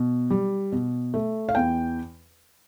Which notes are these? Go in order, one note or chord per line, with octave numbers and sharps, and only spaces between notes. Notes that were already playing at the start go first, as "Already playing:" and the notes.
Already playing: B2
G3
B2
A3
F5
E2 G5